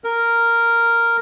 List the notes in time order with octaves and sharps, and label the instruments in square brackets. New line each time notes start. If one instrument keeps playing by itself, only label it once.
[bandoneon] A#4